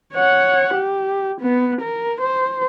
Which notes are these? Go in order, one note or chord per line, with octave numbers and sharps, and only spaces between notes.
C#5 F#5
G4
B3
A#4
C5